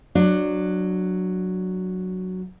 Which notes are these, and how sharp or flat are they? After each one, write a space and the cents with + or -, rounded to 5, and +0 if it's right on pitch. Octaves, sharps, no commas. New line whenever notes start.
F#3 +0 D4 +15